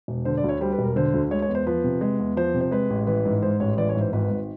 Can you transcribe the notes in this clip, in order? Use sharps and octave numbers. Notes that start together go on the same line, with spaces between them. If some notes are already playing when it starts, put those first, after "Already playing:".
E1
D3 C5
D5
D2 C#5
G3 C5
B4
E1
A#4
D3 C5
D2
G#3 C#5
C#5
E2
C5
F3 B4
C3
G#3
E2
F3 C5
C3
C5
G#3 B4
A1
E3 B4
G#2
G#3 C5
A1 C#5
E3 D5
C#5
G#2
C5
G#1 B4
G#1